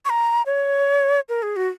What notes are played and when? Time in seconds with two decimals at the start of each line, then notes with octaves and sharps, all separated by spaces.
0.05 C#6
0.10 A#5
0.46 C#5
1.29 A#4
1.43 G#4
1.56 F#4